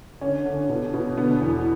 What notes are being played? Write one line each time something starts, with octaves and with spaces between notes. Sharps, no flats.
D3 C#4
D3
B2
B2
D3 B3
E2